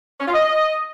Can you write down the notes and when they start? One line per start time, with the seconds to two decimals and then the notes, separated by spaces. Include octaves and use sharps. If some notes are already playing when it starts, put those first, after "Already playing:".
0.20 C#4
0.27 F4
0.33 D#5